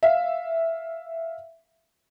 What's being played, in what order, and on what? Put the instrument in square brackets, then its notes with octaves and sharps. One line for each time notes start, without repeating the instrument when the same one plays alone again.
[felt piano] E5 F5